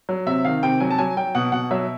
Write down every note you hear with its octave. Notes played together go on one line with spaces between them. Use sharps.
F#3
C3 E5
D#3 F5
C3 G5
F#3 G#5
A5
F#3 G#5
F#3 G5
B2 F#5
B2 F#5
F#3 E5